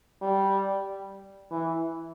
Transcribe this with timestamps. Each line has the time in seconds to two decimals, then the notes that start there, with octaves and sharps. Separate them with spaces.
0.22 G3
1.51 E3